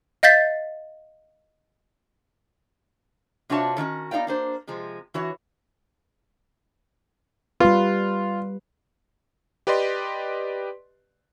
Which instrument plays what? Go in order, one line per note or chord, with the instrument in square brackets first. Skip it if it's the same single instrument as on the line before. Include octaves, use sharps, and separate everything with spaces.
[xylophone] D#5 F5 G6 A6 B6
[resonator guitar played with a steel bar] C3 D4 F4 F#4 C#5 A5
D3 D#3 C#4 F#4
B3 D#4 F#4 D5 F5 G5
A#3 D4 C5
C3 F3 G#3
E3 F#4 C#5
[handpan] G3 B4 [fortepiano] F4
[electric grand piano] G4 B4 D5 D#5 C6